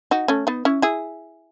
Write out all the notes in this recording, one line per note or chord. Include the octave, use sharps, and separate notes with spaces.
D#4 F#4
A3 C#4
B3 D#4
C#4 E4
E4 G#4